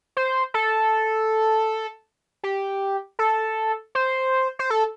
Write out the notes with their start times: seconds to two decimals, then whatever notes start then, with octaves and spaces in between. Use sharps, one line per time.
0.17 C5
0.54 A4
2.43 G4
3.19 A4
3.95 C5
4.59 C5
4.70 A4